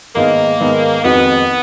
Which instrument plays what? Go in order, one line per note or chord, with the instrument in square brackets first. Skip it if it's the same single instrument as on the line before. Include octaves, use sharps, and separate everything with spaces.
[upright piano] G#2 D#3 G#3 B3 D#4 [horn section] A#3
[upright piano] G#2 D#3 G#3 B3 D#4
[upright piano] F2 D#3 G#3 D#4 F#4 [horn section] B3